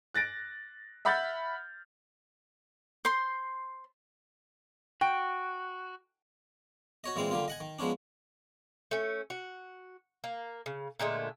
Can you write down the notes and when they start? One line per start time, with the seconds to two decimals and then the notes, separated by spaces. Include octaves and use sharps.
0.14 F#6 A6 A#6 D7
1.05 E5 F#5 B5 F6 G6 A6
3.05 C5 C6
5.01 F#4 G5
7.04 F#4 C#5 D#5
7.16 A#2 E3 G#3 C4 F5
7.31 D3 G3 A#3 F4
7.48 D#5 F#5 G#5
7.60 D#3
7.79 F3 G#3 B3 C#4 D4
8.91 A3 C#4
9.30 F#4
10.24 A#3
10.66 C#3
10.99 A#2 D3 G#3 A3